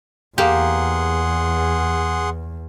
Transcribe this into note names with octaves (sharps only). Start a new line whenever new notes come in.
E2 A#3 G4 G#4 F#5 C6